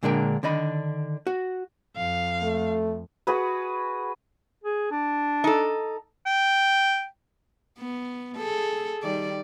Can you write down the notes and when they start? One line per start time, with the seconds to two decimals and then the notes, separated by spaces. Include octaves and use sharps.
0.03 A#2 D3 G#3 D4 A#4 G5
0.43 D3 D#3 D4 D#5 B5
1.27 F#4
1.97 F2 F5
2.43 A3
3.27 F#4 G#4 B4
4.64 G#4
4.91 D4
5.44 D#4 A4
6.26 G5
7.79 B3
8.37 G#4 A4
9.03 D#3 G3 D5